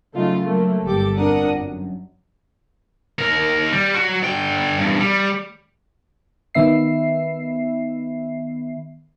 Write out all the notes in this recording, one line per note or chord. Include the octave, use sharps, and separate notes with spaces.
C#3 F#3 A3 D#4 F4
F#3 A3 A#3
G1 G4 A4 D6
F2 D4 A#4 F#5 D#6
F#2
D#2 A#4
G3
F#3 F#4
D3 G5
E2 G2
G3
D#3 B3 E5 C7